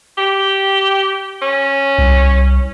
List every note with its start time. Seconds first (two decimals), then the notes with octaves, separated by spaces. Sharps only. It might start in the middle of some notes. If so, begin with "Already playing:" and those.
0.18 G4
1.42 C#4
1.98 C2